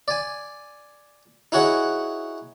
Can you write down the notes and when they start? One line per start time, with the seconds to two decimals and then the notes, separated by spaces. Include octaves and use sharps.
0.08 D5 G#5
1.52 D#4 E4 F#4 G#4 C#5 F#5